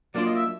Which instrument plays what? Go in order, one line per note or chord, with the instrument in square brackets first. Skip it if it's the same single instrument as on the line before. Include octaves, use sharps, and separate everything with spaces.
[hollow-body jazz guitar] F#3 A#3 D4 F4 [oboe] D5
[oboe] D#5
E5